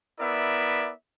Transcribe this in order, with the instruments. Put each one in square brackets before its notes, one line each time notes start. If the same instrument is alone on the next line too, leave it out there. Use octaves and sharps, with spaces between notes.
[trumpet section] B3 E4 A#4 D5 E5